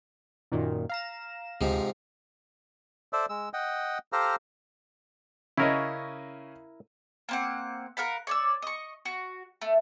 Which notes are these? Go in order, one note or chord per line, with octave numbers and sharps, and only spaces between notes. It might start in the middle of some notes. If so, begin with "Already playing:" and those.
F#2 A#2 D#3
F5 A#5 E7
D2 G#2 C3 F3
A4 C5 D5 E5
G#3 E6
D#5 F#5 G5
G4 A4 C5 F5 A#5
C#3 C#4 E4 A#4 D#5
A#3 C4 F#5
A#4 F5 F#5 B5
C#5 D5 E6
D#5 C#6
F#4
A3